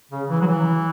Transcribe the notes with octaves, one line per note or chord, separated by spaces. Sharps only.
C#3
E3
F#3
E3